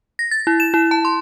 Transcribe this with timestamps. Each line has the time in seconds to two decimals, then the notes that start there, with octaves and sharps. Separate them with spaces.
0.19 A#6
0.31 A6
0.47 E4
0.60 E7
0.74 E4
0.91 A5
1.05 C6